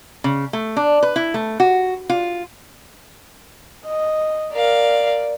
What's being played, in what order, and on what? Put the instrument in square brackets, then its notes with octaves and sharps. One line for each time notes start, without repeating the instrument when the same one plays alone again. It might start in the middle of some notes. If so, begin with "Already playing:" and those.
[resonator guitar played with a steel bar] C#3
A3
D4
B4
E4
A3
F#4
F4
[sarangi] D#5
[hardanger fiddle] A#4 F5 [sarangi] D5